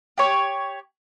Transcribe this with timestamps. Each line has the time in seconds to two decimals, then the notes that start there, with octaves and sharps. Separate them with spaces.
0.18 G4 C#5